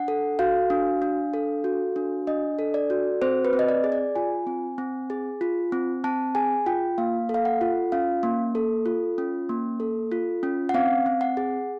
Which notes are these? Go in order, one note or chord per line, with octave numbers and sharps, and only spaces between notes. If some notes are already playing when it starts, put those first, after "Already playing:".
Already playing: D4 F#5
A4
F#4 F5
D4
D4
A4
F#4
D4
D4 D#5
A4
D5
F#4
C4 C5
B4
C4
D#5
D5
G#4
D5
F4 G#5
C4
C4
G#4
F4
C4
C4 A5
G#4 G#5
F4 G5
A#3 F5
A4
F5
F#5
F4
C#4 F5
A#3
A4
F4
C#4
A#3
A4
F4
C#4
F#5
C4 F5
C4
F#5
G#4